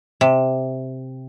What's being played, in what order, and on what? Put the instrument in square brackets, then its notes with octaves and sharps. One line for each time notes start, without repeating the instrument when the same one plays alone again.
[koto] C3